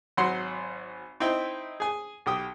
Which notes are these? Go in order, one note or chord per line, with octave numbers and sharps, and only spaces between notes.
G#1 F#3 F#5 C6
C4 D#4 E4 G5
G#4 G#5
B1 G4 G5 D#6